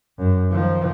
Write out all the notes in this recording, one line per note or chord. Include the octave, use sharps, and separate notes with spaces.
F#2
D#3 F3